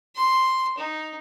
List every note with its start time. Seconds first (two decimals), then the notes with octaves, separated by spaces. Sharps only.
0.16 C6
0.78 D#4